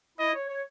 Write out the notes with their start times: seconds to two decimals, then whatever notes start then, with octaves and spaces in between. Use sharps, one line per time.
0.18 E4 D#5
0.34 C#5
0.49 C#5